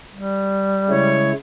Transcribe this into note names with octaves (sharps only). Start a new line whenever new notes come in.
G3
C#3 G#3 E4 C#5